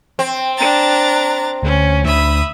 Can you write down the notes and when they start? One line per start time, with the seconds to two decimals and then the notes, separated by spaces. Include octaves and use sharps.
0.19 C4
0.57 D4 A#5 A6
1.63 D2 C#4
2.04 D2 D3 E5 B5 D#6